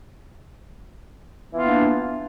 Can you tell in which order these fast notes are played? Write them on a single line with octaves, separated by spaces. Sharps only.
B3 E3 F4 A#3 D4